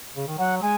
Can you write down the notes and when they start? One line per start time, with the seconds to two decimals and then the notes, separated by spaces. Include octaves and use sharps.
0.17 C#3
0.28 D#3
0.39 F#3 F#5
0.62 G#3 G#5